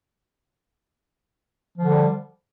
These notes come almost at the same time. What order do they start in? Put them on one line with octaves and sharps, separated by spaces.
F3 D3 G3